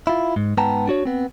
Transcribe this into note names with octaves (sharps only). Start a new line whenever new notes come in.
E4 F4
G#2
G#2 B3 G5 A5 A#5
D4 F#4 C#5
B3 C4